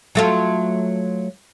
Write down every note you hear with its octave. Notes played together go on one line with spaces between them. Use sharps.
F#3 A3 F4